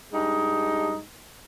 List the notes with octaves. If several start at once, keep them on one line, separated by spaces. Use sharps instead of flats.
G2 G#3 D#4